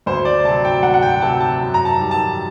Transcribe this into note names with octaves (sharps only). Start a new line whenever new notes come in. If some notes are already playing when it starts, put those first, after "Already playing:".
D2 C5
D5
C3 F#3 A5
G5
D2 F#5
F#5
G5
C3 F#3 A5
A5
F#2
A#5
A5
D#3 G3
A5